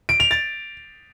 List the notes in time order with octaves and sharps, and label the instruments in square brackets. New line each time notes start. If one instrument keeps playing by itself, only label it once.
[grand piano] D7
F7
A6